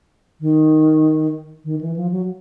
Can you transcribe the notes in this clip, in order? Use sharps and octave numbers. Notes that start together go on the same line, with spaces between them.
D#3
D#3
E3
F3
F#3